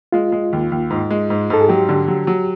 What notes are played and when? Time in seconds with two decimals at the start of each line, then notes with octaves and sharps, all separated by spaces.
0.12 G#3 F4
0.32 G#3
0.53 D#2
0.72 D#2
0.90 G#2
1.10 G#3
1.30 G#2
1.50 G#2 A4
1.61 G#4
1.69 F#3 G4
1.89 D3
2.08 F#3
2.27 F#3